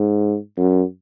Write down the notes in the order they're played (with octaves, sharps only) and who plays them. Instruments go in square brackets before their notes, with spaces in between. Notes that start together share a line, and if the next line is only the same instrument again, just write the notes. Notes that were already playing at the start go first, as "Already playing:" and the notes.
Already playing: [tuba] G#2
F#2